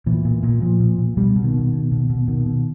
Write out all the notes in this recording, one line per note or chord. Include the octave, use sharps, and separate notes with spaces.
A#2 E3
A#2
A#2
A#2 F3
A#2
A#2
B2 G3
B2
D#3
B2
B2
B2
B2
B2 D#3
B2